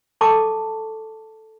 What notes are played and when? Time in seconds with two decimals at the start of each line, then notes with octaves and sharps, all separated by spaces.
0.21 A4 A5 C#6 D6